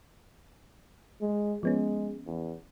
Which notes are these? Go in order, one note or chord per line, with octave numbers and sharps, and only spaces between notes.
G#3
F3 G#3 B3 C#4
E2